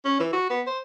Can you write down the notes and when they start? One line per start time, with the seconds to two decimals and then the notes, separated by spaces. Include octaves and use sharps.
0.05 C#4
0.20 E3
0.33 F#4
0.50 B3
0.67 C5